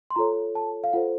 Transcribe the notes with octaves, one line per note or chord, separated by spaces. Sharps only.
C6
F4 A4 C#5 A#5
A5
F5
F4 A4 C5 F#5